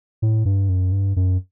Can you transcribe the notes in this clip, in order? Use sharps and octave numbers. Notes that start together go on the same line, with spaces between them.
A2
G2
F#2
G2
F#2